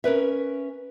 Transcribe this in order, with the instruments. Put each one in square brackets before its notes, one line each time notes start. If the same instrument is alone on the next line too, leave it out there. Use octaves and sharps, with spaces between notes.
[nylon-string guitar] C#4 A#4 B4 E5